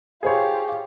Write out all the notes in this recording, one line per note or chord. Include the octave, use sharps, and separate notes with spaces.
F4 G4 G#4 C5 C#5